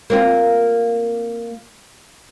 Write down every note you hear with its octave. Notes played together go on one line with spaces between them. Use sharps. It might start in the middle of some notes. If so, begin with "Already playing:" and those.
A#3 C4 F4